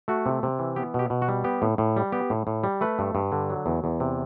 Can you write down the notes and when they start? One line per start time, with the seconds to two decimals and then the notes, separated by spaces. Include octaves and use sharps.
0.08 A3 F#4
0.26 C3
0.43 C3
0.59 E3
0.76 B3 G4
0.94 B2 G4
1.10 B2
1.22 F#4
1.28 G3
1.44 B3 G4
1.62 A2
1.78 A2
1.97 G3
2.12 B3 G4
2.30 A2
2.47 A2
2.64 G3
2.81 A3 B4
2.99 G2
3.15 G2
3.32 D3
3.50 F#3
3.66 E2
3.84 E2
4.00 C3